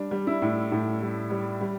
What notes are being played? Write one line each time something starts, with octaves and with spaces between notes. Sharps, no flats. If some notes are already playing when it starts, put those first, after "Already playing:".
Already playing: G3 D4
G3
E4
A2
A2
G3
G3
G3